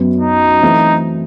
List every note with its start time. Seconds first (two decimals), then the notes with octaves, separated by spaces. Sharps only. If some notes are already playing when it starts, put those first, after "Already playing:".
Already playing: F#2 F#3 B3
0.20 D#4
0.62 E3 A3 C4 E4 A4